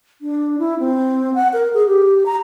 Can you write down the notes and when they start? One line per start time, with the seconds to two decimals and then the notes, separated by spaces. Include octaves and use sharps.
0.21 D4
0.59 E4
0.80 C4
1.34 F#5
1.53 A#4
1.74 G#4
1.87 G4
2.26 A#5